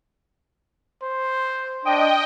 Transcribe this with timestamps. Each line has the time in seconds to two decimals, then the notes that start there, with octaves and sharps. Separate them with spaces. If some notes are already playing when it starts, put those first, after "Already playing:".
1.02 C5
1.85 D4 D#5 G5